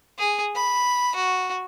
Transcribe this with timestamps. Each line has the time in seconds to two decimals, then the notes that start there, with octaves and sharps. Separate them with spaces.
0.19 G#4
0.55 B5
1.15 F#4